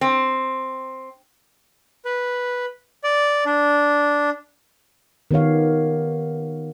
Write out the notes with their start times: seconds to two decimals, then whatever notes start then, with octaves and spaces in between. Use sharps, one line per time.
0.01 C4
2.05 B4
3.04 D5
3.46 D4
5.31 D#3 B3 G4 C#5 F5